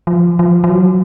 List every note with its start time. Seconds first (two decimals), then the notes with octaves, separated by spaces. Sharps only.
0.07 F3
0.39 F3
0.64 F3
0.70 F#3